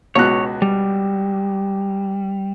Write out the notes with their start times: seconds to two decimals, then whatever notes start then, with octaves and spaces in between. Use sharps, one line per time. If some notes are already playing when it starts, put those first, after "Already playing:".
0.15 C#2 B2 C#5 F#6
0.62 G3